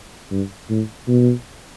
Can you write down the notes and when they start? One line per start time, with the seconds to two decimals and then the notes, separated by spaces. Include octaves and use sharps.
0.31 G2
0.70 A2
1.08 B2